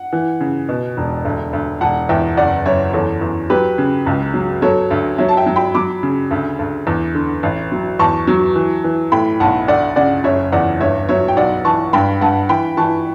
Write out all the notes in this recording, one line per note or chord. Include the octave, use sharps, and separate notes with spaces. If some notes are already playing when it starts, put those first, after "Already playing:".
Already playing: F#5
E3
C#3
B2
E1
D2
D2
E1 F#5 A5
E2 E5 G5
F#1 D5 F#5
F#2 C#5 E5
E2 A4 C#5
E2
F#3 G4 B4
C#3
C#2
F#3
F#3 A4 C#5
D2
F#3 C#5 E5
A5
E5 G5
F#3
G5 B5
F#3 B5 D6
C#3
D2
D2
E2
D3
A1
F#3
E2 A5 C#6
F#3
E3
E3
A2 G5 B5
B1 F#5 A5
D2 D5 F#5
C#3 D5 F#5
F#1 C#5 E5
E2 D5 F#5
G2 C#5 E5
F#3 C#5 E5
G5
B1 D5 F#5
E3 A5 C#6
G2 G5 B5
G2 F#5 A5
E3 G5 B5
E3 A5 C#6